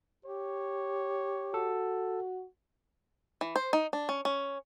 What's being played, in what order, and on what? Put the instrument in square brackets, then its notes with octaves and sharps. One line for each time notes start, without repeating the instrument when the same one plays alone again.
[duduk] G4 [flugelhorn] C#5
[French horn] F#4 [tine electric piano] A4
[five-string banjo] E3
C5
D#4
D4
C#4
C#4